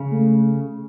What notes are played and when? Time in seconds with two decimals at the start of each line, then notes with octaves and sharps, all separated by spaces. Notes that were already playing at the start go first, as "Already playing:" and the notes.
Already playing: C#3
0.12 A3